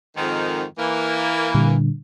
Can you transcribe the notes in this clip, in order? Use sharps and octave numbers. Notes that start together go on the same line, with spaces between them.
F2 G#2 D#3
E3 A#3
A#2 D3 G3